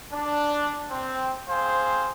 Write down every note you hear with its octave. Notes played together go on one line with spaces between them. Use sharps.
D4
C4
C4 G#4 C5 F5